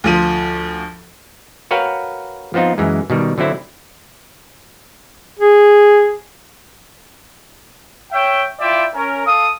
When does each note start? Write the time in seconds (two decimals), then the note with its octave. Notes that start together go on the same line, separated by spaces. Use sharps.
0.04 D2 F3 D#7
1.71 F#4 A#4 B4 C#5 F5 G5
2.54 F3 B3 C4 D#4 F4
2.78 F#2 E3 G#3
3.10 B2 D#3 G3
3.38 D3 F#3 C4 E4
5.39 G#4
8.12 C#5 E5 G5
8.60 E4 F4 D5 E5 G5
8.95 C#4 A#4
9.26 A4 F5 D#6